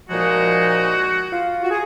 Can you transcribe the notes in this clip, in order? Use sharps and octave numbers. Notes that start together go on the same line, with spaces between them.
A#2 F3 G#3 D#4 F#4
F4
F#4
G#4